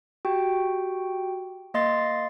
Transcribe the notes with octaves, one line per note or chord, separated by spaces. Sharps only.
F#4 G4 G5
A#3 D#5 C6 A6 C7